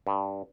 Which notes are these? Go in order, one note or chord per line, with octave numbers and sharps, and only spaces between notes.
G2